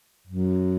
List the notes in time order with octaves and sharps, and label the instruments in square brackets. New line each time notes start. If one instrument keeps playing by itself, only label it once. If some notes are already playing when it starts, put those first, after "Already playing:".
[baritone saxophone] F#2